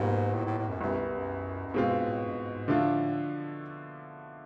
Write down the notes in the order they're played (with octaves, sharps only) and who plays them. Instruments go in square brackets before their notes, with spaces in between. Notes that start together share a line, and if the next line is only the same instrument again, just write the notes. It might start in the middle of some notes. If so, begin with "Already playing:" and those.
Already playing: [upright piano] C#2 B2 G3 A#3 [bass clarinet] G#2
[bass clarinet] A2
A2
A2
F#2
[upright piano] C2 B2 G3 B3 E4 [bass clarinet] F#2
[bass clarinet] F#2
F#2
[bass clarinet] G2 [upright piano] B2 G#3 C4 F4
[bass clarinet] G2
A2
G2
G#2
G#2
[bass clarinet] A2 [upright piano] D3 F3 A3 D4 F4